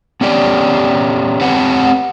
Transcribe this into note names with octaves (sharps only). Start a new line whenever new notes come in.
B3 C#4 G4 D5
C4 G4 B4 C#5 F#5